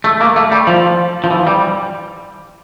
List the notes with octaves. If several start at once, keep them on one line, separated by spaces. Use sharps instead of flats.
A3
A#3
A3
G3
F3
F3
E3
G3